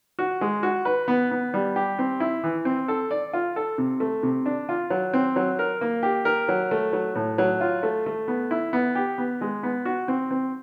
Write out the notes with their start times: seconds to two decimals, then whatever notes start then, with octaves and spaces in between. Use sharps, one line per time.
0.19 F#4
0.41 G#3
0.63 F#4
0.85 B4
1.08 B3
1.31 B3
1.54 G3
1.76 G4
1.99 C4
2.20 E4
2.44 E3
2.65 C4
2.88 A4
3.11 D5
3.34 F4
3.56 A4
3.78 C3
4.00 A3
4.23 C3
4.46 D4
4.69 F4
4.90 F#3
5.14 C4
5.36 F#3
5.59 A#4
5.81 A#3
6.03 G4
6.25 A#4
6.48 F#3
6.71 A3
6.93 F#3
7.15 A2
7.38 F#3
7.61 F4
7.83 A3
8.06 A3
8.28 B3
8.51 E4
8.73 B3
8.95 G4
9.18 B3
9.41 G#3
9.63 B3
9.85 F#4
10.08 C4
10.31 C4